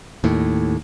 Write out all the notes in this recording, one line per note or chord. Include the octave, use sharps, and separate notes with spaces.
D#2 A2